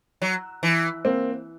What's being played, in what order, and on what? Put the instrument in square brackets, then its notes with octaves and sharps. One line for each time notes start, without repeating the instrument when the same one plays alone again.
[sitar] F#3
E3
[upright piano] A#3 C4